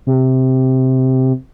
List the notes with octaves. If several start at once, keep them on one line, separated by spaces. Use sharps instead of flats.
C3